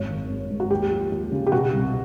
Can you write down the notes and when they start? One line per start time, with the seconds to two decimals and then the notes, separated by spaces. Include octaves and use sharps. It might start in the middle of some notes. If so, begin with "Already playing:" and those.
Already playing: G#1 F#2 C#5
0.10 D#3
0.30 G#1
0.50 G#2
0.60 F#4
0.71 D#2 G4
0.91 F3
1.12 D#2
1.32 C#3
1.47 G4
1.52 B2 F#4
1.73 C2